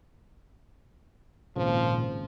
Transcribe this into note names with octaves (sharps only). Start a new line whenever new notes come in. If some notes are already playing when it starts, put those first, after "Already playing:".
G#1 C#2 A#2 F3